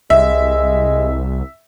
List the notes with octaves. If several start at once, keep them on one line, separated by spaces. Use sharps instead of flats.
C2 G#3 E5